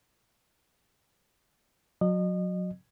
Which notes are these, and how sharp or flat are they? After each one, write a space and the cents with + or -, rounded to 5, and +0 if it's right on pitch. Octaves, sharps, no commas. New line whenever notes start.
F#3 -25 D#5 -30